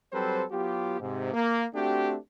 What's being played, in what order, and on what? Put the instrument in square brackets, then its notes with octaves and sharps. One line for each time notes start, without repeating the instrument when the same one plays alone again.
[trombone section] F#3 G3 C4 A4 B4 C5
F#3 B3 F4 G4
G#2 C3
A#3
A3 C4 D4 F#4 G4